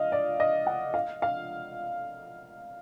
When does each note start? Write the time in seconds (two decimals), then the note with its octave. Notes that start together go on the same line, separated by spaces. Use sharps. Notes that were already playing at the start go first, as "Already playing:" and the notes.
Already playing: D#5 F5
0.12 D5
0.40 D#5
0.67 F#5
0.94 F5
1.22 F5